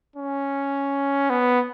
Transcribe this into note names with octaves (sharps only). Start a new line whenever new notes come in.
C#4
B3